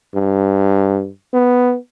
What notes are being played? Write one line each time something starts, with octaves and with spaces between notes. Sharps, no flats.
G2
B3